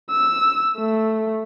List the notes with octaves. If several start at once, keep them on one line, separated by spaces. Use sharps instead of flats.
E6
A3